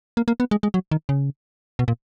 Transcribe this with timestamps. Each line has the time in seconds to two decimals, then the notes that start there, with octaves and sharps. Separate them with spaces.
0.17 A#3
0.28 A#3
0.40 B3
0.51 G#3
0.63 G#3
0.74 F#3
0.91 D#3
1.09 C#3
1.79 B2
1.88 A#2